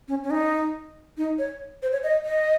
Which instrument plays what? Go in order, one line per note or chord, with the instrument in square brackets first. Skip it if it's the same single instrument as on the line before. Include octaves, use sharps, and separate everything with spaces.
[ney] C#4
C#4
D#4
D#4
C#5
C5
C#5
D#5
D#5